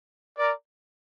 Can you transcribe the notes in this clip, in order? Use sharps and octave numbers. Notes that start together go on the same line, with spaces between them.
A#4 D5